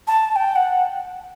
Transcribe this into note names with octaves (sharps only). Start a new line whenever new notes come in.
A5
A5
G5
F#5